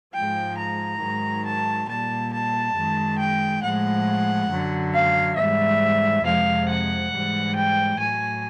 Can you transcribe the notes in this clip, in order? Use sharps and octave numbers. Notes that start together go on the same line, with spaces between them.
G#2 F3 G#3 G5
A#5
G#2 D#3 F#3
A5
A#2 G3 A5
A5
F#2 D#3 G#3
G5
A2 F3 G#3 F#5
F#2 D3 F#3
F5
G#2 E3 G3 E5
F2 C3 F3 G#3 F5
F#5
G#2 E3 G3
G5
A2 F#3 G#5